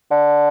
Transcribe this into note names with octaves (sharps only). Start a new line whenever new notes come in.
D3